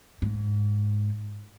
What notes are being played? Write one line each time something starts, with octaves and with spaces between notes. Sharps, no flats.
G#2